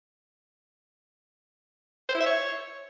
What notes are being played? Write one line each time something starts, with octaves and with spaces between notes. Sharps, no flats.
C5
E4
E5
C#5